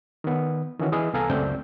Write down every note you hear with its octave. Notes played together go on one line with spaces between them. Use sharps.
D#3 B3
D#3 E3 C#4 F#4
E3 G#4 D#5 B5 D#6
C2 B3 A4 F5 G#5 A#5
C#2 F#2 A3 C4 D5 G6